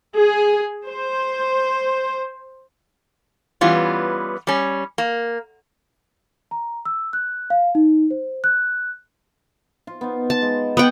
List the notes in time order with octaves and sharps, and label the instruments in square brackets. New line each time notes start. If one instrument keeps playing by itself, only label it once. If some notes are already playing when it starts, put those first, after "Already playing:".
[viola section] G#4
C5
[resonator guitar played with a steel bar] E3 G3 B3 C#4 F4
G3 C#4
A#3
[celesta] A#5
E6
F#6
F5
D#4
C5
F#6
[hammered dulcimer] F4
B3 D#4 F4
[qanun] A5
[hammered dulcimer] G#3
[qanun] B3 F#5 G5